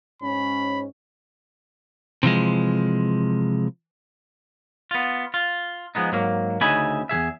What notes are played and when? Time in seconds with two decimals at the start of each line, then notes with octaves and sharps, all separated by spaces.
0.22 G#2 C#4 B5
2.23 C3 E3 F3 G#3
4.91 B3 F4
5.34 F4
5.95 F3 G#3 B3 D#4
6.12 G#2 F#3 A#3
6.61 D2 C#3 D#4 E5 G#5 B5
7.09 E2 F3 G#4 E5